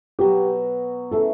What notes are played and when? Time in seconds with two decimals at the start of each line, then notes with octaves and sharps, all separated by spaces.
0.19 B2 F#3 B3 G4
1.11 C#3 E3 A3 A4